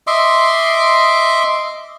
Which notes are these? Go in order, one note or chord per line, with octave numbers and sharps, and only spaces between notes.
D#5 E5 C6 D6